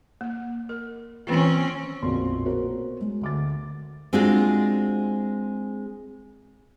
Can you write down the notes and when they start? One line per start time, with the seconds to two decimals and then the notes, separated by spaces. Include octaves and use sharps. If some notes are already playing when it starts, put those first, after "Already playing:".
0.21 A#3
0.69 A#4
1.27 D#3 E3 C4 C#4 F4
2.03 A#1 F2 B2 A#4 C6
2.45 B3 F#4 A#4 C5 C#5
3.01 G#3
3.21 D2 D6 A6
4.13 G#3 C4 D4 F4 F#4 G#4